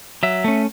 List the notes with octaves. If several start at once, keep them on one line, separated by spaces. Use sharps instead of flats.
F#3 E5
A3 C#4